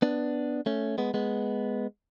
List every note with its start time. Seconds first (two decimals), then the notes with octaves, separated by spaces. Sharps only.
0.02 B3 D4
0.66 A3 C#4
0.98 G#3 B3
1.14 G#3 B3